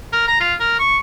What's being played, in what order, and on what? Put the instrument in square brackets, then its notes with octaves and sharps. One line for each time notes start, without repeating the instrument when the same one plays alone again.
[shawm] A#4
A#5
F4
A#4
C#6